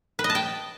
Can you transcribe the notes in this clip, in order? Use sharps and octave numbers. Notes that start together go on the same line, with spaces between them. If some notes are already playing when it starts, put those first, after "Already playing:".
B4
D#5
A5
G5